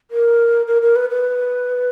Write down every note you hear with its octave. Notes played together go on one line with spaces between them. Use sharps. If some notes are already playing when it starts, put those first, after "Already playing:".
A#4
A#4
A#4
B4
B4